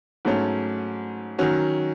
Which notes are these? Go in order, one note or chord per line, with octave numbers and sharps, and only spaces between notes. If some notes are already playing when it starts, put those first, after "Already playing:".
G#2 F#3 A3 C#4
D#3 F#3 C#4 F#4